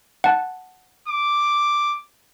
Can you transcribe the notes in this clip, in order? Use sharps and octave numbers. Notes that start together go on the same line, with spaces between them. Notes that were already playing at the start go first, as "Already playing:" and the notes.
F#5 A5
D6